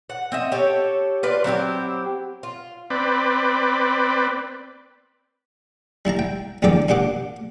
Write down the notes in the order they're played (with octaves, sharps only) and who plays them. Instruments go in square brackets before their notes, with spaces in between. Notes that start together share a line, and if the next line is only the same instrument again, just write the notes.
[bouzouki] F#5
C4 D#5 E5
G4 A4 C#5
F4 B4 D5
F#3 C4 E4 G4
F4
[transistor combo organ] C4 B4 D5
[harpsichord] G3 E4 A5 A#5
G5
A1 E2 D3 A4 D5 G5
A#2 D4 G4 F#5 D6